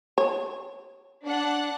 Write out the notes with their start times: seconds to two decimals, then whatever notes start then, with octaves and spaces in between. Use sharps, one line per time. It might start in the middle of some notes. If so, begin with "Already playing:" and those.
0.18 C#5
1.25 D4 F#5